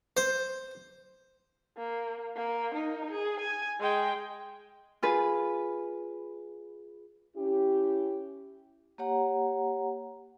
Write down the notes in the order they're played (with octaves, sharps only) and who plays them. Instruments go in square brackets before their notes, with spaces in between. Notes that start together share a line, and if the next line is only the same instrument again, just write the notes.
[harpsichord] C5
[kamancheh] A#3
A#3
D#4 A#4
G#4
G#5
G#3 G5
[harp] F4 G#4 B4
[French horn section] C#4 E4 G4
[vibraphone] A#3 G4 C#5 F#5 A#5